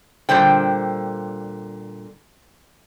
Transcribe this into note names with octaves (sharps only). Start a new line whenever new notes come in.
A#2 D3 G3 C5 G5